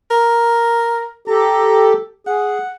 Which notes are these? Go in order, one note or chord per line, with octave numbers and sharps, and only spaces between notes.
A#4
G4 A4 A#5
G#4 F#5